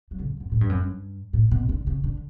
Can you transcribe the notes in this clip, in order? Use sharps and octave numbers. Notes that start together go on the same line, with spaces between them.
F#3
D3
E2
F#2
A2
G2
F#2
G2
A2
B2
D3
C#3
D3